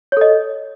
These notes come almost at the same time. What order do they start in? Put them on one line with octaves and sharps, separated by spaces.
C#5 A4 D#5